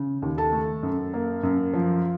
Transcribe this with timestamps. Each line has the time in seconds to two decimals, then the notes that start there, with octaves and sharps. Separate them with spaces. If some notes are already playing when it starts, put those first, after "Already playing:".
Already playing: C#3
0.22 D#2
0.38 A4 A5
0.53 A3
0.83 F#2
1.14 A#3
1.43 F#2
1.73 F3